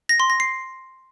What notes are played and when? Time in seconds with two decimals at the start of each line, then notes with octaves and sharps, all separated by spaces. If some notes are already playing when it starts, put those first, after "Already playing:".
0.09 A#6
0.20 C6
0.30 A#6
0.40 C7